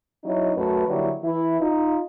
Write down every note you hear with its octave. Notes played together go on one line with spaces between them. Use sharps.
F#3 C#4 D#4 E4
F#2 A3 F#4 B4
D3 F#3 G3 A#3 E4
E3 E4
D#4 F4